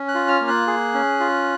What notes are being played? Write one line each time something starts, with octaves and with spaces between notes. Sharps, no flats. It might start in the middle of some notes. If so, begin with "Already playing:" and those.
Already playing: C#4
F#6
F4
F6
A#3
F#6
G#4
C#4
F4